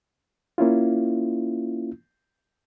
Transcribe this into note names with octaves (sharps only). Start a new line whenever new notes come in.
A#3 C#4 E4 F4